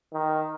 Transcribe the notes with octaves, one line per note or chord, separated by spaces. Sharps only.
D#3